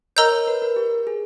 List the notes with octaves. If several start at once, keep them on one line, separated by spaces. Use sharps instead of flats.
A#4 C#5 D#5 A#5 E6 G6
C#5
B4
A#4
G4
G#4